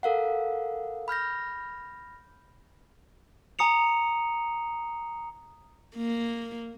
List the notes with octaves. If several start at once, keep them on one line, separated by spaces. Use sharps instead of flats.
A4 A#4 F5 F#5
B5 F6 G6 A#6
G#5 A#5 D#6 C#7 F7
A#3